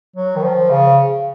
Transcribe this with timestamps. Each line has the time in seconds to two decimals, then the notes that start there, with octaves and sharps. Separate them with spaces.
0.16 F#3
0.36 D#3
0.43 F3
0.70 C#3